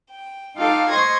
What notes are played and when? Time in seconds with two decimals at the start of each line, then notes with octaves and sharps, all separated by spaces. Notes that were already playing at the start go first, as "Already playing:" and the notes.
0.10 G5
0.55 D#4 F4 A4 F5 G5 D6
0.88 C5 D#5 C6 C#6 G#6 A#6